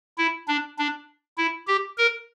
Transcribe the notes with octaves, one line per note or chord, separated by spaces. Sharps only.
E4
D4
D4
E4
G4
A#4